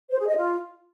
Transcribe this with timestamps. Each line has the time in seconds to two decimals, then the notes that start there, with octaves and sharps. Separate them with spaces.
0.10 C5
0.19 G#4
0.28 D#5
0.36 F4